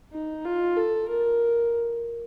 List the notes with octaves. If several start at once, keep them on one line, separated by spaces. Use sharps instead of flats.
D#4
F4
A4
A#4